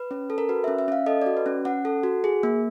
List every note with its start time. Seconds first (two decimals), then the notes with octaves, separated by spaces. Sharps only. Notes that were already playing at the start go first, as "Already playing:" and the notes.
Already playing: B4
0.11 C#4
0.30 A4
0.38 A#4
0.49 F#4 B4
0.64 C#4 E5
0.79 E5
0.88 C#4 F5
1.06 A4 D#5
1.21 F#4 D5
1.37 B4
1.46 C#4
1.65 C#4 F#5
1.85 A4
2.03 F#4
2.24 G#4
2.43 A#3